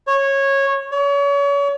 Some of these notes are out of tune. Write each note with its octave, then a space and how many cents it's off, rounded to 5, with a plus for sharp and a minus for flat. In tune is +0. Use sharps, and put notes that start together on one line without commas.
C#5 -15
C#5 +35